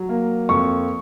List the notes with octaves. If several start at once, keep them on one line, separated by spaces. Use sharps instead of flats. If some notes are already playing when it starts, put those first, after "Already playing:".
Already playing: F#3
A#3
F2 C#6